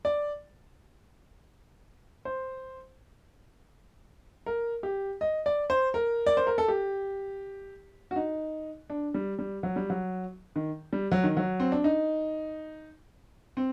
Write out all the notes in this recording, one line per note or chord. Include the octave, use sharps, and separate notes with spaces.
D5
C5
A#4
G4
D#5
D5
C5
A#4
D5
C5
A#4
A4
G4
F#4
D#4
D4
G3
G3
F#3
G3
F#3
D#3
G3
F#3
D#3
F#3
C4
D4
D#4
C4